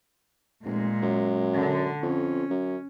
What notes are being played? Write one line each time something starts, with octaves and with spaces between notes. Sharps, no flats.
F1 A#2 G#3
F#2
D3
F2 C#4
F#2